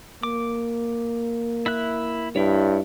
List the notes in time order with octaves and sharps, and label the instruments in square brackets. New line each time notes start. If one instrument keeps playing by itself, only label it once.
[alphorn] A#3 [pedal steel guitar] D6
[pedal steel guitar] E4 E5 F#6
[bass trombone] G2 [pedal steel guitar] E4 C#5